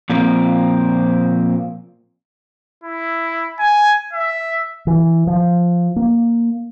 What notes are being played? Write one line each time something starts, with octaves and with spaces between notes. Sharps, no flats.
A#2 F3 A#3 C4
E4
G#5
E5
E3
F3
A#3